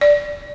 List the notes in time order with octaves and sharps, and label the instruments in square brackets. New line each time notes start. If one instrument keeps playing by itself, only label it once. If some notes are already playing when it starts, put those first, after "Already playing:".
[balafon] D5